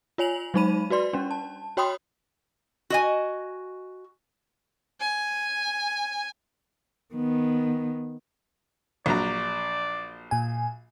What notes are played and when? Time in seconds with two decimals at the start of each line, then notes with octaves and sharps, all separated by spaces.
0.18 F4 C#5 G#5 F7 F#7
0.54 F#3 G#3 D#4 C5 B5 D#7
0.90 F#4 B4 D5 C6
1.13 G3 C#4 D4
1.31 A5
1.77 F#4 C#5 G5 B5 C6 D#6
2.90 F#4 D#5 G#5
5.01 G#5
7.14 D#3 B3
9.06 A#1 F#3 D5 A#5
10.31 A#2 G#5